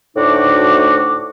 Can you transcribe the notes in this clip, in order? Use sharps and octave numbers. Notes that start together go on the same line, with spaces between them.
D2 A2 D3 D#4 F#4 D6